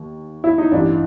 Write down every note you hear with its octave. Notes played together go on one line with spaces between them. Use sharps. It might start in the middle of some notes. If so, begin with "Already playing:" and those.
Already playing: D#2
E4
D#4
A1 G2 E3 D4